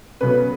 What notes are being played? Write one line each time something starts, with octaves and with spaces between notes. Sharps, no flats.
C#3 F#3 B3 B4